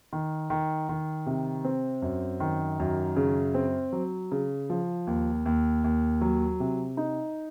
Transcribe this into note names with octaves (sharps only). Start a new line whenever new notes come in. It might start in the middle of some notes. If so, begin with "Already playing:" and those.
D#3
D#3
D#3
C3
C4
F#2
D#3
F#2
C#3
C4
F#3
C#3
F3
D#2
D#2
D#2
F#3
C3
D#4